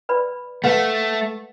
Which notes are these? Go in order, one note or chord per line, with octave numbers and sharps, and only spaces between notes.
B4 D5 B5
A3 B4 F5 F#5